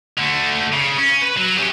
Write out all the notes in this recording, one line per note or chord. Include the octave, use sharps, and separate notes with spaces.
D3 A3
C#3
C#4
B4
F#3
C#4 G4